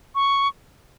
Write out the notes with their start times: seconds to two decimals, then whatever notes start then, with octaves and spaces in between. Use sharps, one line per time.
0.15 C#6